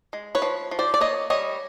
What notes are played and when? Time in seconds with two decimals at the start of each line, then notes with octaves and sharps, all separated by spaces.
0.13 G#3
0.35 B4 C#5
0.42 F3
0.71 F3
0.79 C5 D5
0.94 D5
1.00 A#3 C#5 D#5
1.30 G3 C#5 D#5